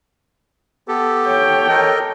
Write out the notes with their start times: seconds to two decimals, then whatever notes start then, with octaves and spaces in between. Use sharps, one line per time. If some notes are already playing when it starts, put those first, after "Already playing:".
0.88 B3 G4 A4
1.26 C#5 G5
1.69 A4 A#4 D#5